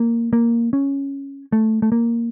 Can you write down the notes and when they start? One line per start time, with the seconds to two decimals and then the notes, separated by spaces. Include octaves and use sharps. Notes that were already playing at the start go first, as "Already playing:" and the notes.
Already playing: A#3
0.33 A#3
0.73 C#4
1.52 A3
1.82 A3
1.92 A#3